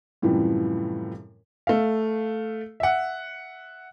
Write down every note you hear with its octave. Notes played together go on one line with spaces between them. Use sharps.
F#2 A2 C3 E3 F3 G3
A3 F5
E5 F#5